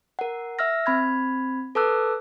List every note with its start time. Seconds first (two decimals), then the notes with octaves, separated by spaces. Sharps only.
0.19 A#4 F#5
0.59 E5 E6 F6 A#6
0.86 C4 B5 G#6
1.75 A4 B4 A5 D6 E6 F#6